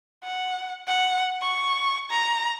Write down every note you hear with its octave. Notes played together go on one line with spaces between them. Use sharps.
F#5
F#5
C#6
A#5